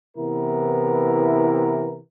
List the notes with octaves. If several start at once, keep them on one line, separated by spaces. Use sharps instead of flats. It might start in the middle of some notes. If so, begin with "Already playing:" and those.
C3 E3 B3 E4 A#4